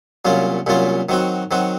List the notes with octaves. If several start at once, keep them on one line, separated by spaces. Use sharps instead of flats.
C2 A#2 F#3 C#4 F4
C2 A#2 F#3 C#4 F4
D#3 F#3 C4 F#4
D#3 F#3 C4 F#4